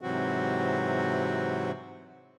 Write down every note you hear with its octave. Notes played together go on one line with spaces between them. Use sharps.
G#2 C3 E3 F#3 C4 F#4